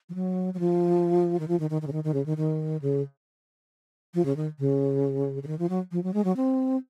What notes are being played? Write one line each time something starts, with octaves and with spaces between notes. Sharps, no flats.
F3
F#3
F#3
F3
D#3
F3
D#3
D#3
D#3
C#3
D#3
D#3
C#3
D#3
D#3
C#3
F3
C#3
D#3
C#3
C#3
D#3
F3
F#3
F3
F#3
G#3
F#3
C4